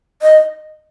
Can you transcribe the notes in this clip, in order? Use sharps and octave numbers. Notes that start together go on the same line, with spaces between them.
D#5